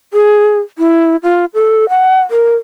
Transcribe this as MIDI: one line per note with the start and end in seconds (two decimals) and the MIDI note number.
0.14 0.58 68
0.78 1.16 64
1.23 1.45 65
1.54 1.88 69
1.89 2.20 78
2.31 2.55 70